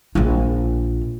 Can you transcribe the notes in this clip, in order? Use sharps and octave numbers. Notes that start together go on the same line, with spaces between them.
A#1 F4